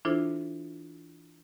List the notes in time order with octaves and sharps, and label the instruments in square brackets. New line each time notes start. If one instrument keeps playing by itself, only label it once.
[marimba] E3 D4 E4 F4 A4 C5